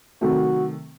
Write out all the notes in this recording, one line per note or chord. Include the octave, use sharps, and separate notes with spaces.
C3 D#3 F#3 A3 F#4